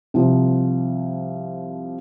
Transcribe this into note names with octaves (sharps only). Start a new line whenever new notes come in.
C2 F3